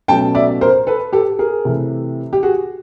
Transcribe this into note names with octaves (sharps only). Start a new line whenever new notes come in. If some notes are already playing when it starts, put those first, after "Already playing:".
B2 F#3 A3 C#4 G5 A5
D5 E5
A#4 C5
A4 B4
G4 A4
G#4 A#4
C3 E3 A3
G4
F#4 G#4